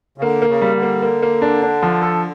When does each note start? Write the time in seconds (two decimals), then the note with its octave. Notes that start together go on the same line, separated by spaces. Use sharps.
0.18 C#3
0.21 D3 A#3
0.42 A#3
0.49 C#3
0.62 G3
0.75 D3
0.83 A#3
1.02 A#3
1.22 A#3
1.42 D4
1.62 D4
1.83 F3
2.02 A4